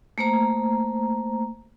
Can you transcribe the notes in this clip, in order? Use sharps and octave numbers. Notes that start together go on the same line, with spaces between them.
A3 A#3 C5 A#5